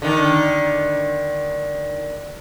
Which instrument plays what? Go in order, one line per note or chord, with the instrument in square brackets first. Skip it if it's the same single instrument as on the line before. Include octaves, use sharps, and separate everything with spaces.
[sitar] D3 D#3